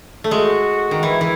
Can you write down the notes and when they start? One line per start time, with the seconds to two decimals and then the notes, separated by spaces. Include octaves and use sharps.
0.24 A3
0.31 G#3 F#4
0.91 D#3
1.03 E3 E4
1.21 E3